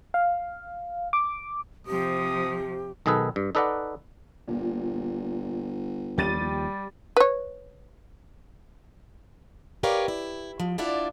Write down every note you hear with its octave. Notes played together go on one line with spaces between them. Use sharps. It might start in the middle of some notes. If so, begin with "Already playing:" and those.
F5
D6
C3 F3 G4 D#6
B1 D#3 G#4 A4 B4
G2
D#4 A4 B4 D5 D#5 F#5
G1 A#2
D#2 F3 G3 G4 A6 D#7
B4 C#5
G4 A#4 B4 C#5 D5 F5
E4
F3
D4 E4 F4 D5 E5 F#5